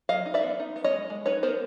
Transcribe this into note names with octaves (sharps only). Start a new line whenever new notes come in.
F#3 D#5 F5
D#4
D5 E5
B3
D#4
B3
C#5 D#5
G#3
G#3
D#4 B4 C#5
B3 A#4 C5